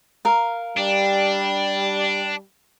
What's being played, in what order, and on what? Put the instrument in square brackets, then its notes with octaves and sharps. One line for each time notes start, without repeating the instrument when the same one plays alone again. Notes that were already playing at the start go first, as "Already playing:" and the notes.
[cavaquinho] A#4 F5
[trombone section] G3 [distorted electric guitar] D4